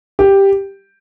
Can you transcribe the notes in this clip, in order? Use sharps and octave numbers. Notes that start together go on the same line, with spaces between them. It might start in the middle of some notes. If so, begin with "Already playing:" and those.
G4